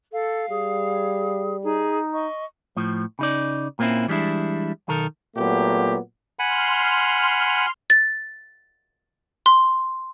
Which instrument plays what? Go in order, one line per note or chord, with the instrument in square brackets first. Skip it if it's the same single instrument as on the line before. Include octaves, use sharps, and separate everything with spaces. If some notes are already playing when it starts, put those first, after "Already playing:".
[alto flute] A4 [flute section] F5
[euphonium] G3 [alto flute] G#4
[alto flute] D#4 [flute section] G#4
[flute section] D#5 C#6
[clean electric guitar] A2 F3
C#3 D#4 D5
A#2 A#3 C4 C#4 E4
E3 G3 G#3 D4 E4
B1 D#3 A4 A#4
[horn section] A#2 F#3 A3 B3 G4
[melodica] F#5 G#5 B5 [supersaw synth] C6 F6
[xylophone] A6
C6